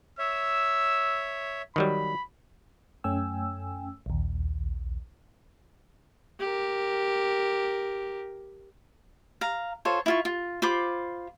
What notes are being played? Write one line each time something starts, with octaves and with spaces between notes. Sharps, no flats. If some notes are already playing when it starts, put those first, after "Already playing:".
C#5 E5 E6
D#3 F#3 G3 B5
F#2 A3 C#4 G5 G#5 E6
A#1 D#2
G4 A#4
F5 A#5
F4 A4 C5 C#5
E4 F4 C#6
F4
F4 C5 B5 D6